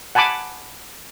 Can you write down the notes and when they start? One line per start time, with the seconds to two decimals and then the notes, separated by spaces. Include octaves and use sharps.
0.15 F#5 G#5 A5 B5 D6